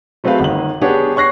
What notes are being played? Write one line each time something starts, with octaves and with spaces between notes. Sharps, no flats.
F#3 A3 C4 G#4 B4 F5
G1 D#3 F#7
B3 D4 G4 G#4 C#5 F#5
C#5 C#6 F#6 A#6 C7